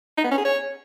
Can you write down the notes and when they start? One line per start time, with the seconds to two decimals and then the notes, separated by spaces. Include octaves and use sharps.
0.17 D#4
0.24 B3
0.31 C#4
0.38 G#4
0.45 C#5